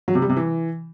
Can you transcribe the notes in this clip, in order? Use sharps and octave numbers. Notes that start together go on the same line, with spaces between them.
F#3
C3
G3
C3
E3